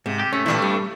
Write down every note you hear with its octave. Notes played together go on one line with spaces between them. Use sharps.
G#2 C3
G4
A3 C#4
G2 A#2 E3 D4 E4
G3